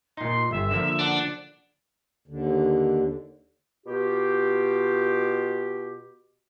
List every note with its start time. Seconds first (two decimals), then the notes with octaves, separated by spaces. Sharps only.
0.17 A#2 D#4 C6
0.51 G1 E5
0.71 D3 F3 A#3
0.99 D4 F#5
2.28 D#2 D3
3.85 B2 F4 G4